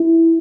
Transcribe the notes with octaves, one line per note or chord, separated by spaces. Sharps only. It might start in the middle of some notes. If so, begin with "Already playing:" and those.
Already playing: E4